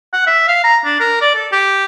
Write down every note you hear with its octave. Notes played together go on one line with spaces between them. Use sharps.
F#5
E5
F5
A#5
D4
A#4
D5
A4
G4